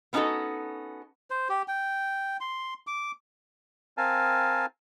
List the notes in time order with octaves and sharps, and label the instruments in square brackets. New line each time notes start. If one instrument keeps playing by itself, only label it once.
[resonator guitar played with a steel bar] B3 C#4 D#4 F4 F#4 A4
[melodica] C5
G4
G5
C6
D6
[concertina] C4 A#4 F5 G#5 A5